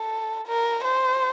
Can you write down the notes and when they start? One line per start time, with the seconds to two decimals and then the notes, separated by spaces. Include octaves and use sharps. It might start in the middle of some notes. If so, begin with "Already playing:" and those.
Already playing: A4
0.47 A#4
0.84 C5